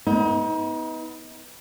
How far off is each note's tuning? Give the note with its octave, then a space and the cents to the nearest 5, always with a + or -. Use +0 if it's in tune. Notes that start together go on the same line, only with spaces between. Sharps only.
B3 +0 D#4 +35